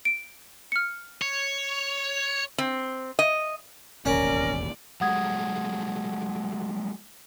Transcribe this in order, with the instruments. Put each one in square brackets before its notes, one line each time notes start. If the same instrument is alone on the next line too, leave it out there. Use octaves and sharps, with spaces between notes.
[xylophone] D7
F6 C#7
[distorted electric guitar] C#5
[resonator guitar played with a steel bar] C4
D#5
[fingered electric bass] E1 A1 D#2 [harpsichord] C#4 [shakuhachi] A#4 [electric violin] D5
[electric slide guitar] F#3 G#3 A3 [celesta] F#5 D#6 G#6